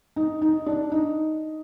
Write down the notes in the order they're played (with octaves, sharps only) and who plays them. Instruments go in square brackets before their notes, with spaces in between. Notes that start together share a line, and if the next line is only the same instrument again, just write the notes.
[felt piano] D#4
D#4
D4
D#4